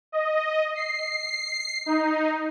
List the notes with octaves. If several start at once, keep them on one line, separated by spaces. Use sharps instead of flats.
D#5
C7
D#4